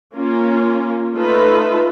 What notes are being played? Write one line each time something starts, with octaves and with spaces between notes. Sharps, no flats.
A#3 C#4 F4
A3 D#4 F4 A4 B4